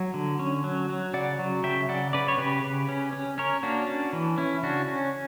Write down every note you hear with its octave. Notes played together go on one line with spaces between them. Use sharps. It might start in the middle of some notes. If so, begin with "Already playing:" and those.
Already playing: F#3 C#5
D3
C#4
F#3
F#3
C#3 D5 F#5
F#3
C#3 E5 G5
C#3 D5 F#5
C#3 B4 D5
C#5
C#3 G4 B4
C#3
C#4
C#4
C#4 A#4 C#5
A#3 D4 F#4
C#4
E3
C#4 E4
C#3 D4 F#4
C#4